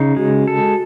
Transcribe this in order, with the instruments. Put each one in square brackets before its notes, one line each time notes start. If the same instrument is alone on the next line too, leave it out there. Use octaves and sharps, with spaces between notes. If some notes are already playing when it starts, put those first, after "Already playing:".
Already playing: [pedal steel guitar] C#3 D#4
[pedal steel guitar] G#3 [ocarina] F#4
[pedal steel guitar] A4